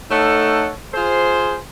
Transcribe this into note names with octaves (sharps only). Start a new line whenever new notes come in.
A3 D#4 A4 C#5 F#5
F4 G#4 C5